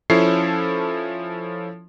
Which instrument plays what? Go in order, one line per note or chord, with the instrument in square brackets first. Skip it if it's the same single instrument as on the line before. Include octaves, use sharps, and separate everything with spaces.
[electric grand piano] F3 C#4 E4 A4 C#5 C7